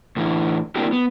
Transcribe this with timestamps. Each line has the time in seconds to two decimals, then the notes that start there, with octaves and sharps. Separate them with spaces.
0.17 A2 D3 E3 E4
0.76 A#3 C4 D4 E4 F#4 G4
0.93 B3